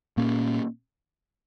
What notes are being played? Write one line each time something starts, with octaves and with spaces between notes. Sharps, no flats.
A#2 A#3 C#4